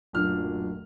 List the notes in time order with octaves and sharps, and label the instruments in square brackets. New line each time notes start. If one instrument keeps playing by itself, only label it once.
[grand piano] D1 F#2 A#2 D4 F6